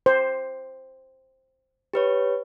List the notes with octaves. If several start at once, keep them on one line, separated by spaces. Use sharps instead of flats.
C5
G4 B4 C#5